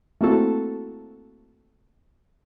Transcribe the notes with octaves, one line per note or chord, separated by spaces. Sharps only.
A3 A#3 C4 E4 F#4 A4